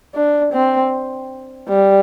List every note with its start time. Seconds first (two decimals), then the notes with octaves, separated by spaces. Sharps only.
0.15 D4
0.53 C4
1.69 G3